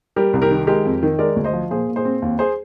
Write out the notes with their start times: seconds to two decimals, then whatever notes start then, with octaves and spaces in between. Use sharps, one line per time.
0.16 G3 G4 A#4
0.33 C2
0.42 G4 A#4
0.51 D#3
0.67 G#3 G4 A#4
0.85 F2
1.03 D#3
1.19 G#3 A#4 D5
1.36 D2
1.44 C5 D#5
1.53 F3
1.71 A#2 G#4 C5
1.88 A#2
1.96 G#4 C5
2.05 C4
2.22 D#2
2.39 G#4 C5